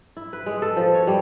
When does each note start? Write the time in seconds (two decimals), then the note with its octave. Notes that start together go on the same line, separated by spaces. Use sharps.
0.17 E4
0.33 B4
0.46 G#3
0.62 A4
0.76 F3
0.94 C#5
1.07 G3